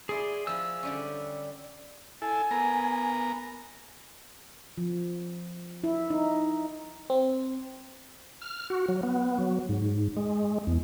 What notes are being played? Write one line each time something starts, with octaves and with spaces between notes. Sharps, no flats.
E4 G#4 D5 C6
F3 E4 G#4 E6
D3 G3 C#4
E4 A4 G#5
B3 A#4 A#5
F3
E4
D#4
C4
F6
F#4
F#3
B3
F#3
G#2
G#3
E2